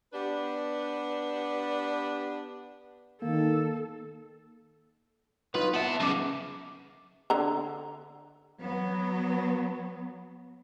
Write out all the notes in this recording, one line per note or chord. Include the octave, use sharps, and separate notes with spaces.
B3 D4 G4 B4
D#3 A#3 A4
F#3 D#4 F4 B4
B3 E5 F#5 A5
F#2 C#3 D#4 D6
D3 A#5
F#3 B3